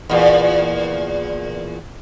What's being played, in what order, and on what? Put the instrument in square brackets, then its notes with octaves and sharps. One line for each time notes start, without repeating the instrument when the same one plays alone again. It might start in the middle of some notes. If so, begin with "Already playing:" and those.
[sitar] E2 A#2